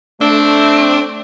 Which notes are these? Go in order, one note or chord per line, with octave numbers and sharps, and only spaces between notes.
A3 C4 D4